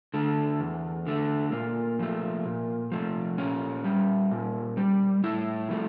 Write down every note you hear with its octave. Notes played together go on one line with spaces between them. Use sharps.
D3 A3
E2
D3 A3
A#2 A#3
F3 A3
A#2
F3 A3
A#2 C#4
G3
A#2
G3
A2 E4
F3 A3